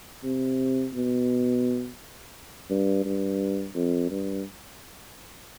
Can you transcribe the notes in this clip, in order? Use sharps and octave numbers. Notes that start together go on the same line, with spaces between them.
C3
B2
G2
G2
F2
G2